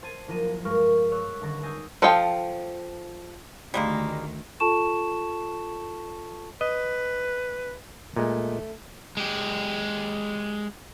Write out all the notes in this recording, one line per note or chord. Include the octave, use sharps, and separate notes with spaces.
C5 A5 G#6 D#7
F#1 F3 A#5 D#7 E7
G2 G#3 A#4 B4 C#6 F6
C#5 E6 F#6
D#1 D3 A5 C#6 A#6
G#5 D#6 E6 G6 A#6 C7
F3 A4 D#5 F5 G5
D2 D#3 G3 G#3 A#3
F4 A4 A5 C#6 E7
B4 D#5
A#2 G#3 A3
G#3 G4